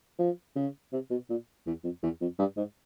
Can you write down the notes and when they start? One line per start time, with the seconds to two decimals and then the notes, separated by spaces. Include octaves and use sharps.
0.19 F3
0.56 C#3
0.92 C3
1.10 B2
1.30 A#2
1.66 E2
1.84 F2
2.03 E2
2.21 F2
2.39 G2
2.57 G#2